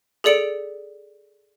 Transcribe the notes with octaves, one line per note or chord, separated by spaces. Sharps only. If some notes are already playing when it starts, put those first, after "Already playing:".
G#4 A4 D5 C#7 D7 F7